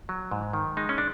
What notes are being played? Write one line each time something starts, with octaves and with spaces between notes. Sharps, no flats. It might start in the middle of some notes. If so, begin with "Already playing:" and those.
F#3
G#2
D#3
G#3 D#4
C#4
D4